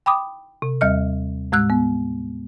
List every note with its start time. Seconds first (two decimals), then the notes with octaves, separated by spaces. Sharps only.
0.06 G5 B5 D6 D#6
0.62 C3
0.81 D#2 G3 D#5 F6
1.52 A2 G#3 E6 F#6
1.70 B3